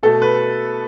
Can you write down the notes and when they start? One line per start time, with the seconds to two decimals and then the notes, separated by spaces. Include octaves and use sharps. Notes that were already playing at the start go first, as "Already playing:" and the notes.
0.03 B2 A3 A4
0.22 B4